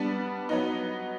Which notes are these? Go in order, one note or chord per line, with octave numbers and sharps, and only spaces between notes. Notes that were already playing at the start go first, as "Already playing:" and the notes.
Already playing: G3 B3 D4
F#3 B3 D#4